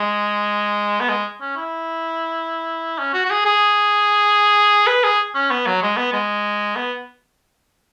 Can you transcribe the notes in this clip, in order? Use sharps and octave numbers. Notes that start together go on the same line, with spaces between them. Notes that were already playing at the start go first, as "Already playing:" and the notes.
Already playing: G#3
B3
G#3
C#4
E4
C#4
F#4
F#4
G#4
G#4
B4
G#4
C#4
B3
F#3
G#3
B3
G#3
B3